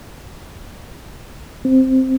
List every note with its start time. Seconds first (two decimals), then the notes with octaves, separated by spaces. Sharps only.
1.65 C4